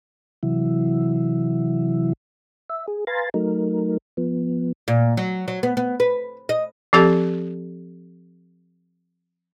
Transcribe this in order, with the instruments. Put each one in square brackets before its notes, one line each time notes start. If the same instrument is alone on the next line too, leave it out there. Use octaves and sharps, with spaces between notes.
[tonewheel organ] C3 E3 F#3 E4
E5
G#4
B4 F5 G#5 A#5 C6 A6
F#3 A3 D#4 A#4
F3 B3
[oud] A#2
F#3
F#3
B3
B3
B4
D#5
[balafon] F3 C4 G4 A4